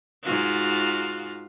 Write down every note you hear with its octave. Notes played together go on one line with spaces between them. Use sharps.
G#2 F4 F#4